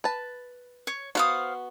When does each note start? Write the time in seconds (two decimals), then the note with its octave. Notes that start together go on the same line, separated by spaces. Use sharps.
0.04 B4 A5
0.87 C#5
1.15 B3 F#4 C5 F5 D#6